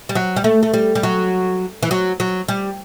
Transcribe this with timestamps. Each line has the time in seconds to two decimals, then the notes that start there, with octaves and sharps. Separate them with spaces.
0.09 G3
0.15 F#3
0.36 G3
0.44 A3
0.63 A3
0.74 G3
0.95 G3
1.03 F#3
1.83 E3
1.91 F#3
2.20 F#3
2.48 G3